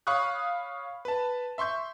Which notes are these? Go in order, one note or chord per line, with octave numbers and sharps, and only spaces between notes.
C#5 F5 B5 C#6 D#6 F#6
B4 A5
E5 C6 C#6 G6